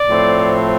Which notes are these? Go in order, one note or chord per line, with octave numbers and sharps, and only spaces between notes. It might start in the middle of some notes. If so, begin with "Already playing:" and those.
Already playing: D5
A2 F3 A3 C4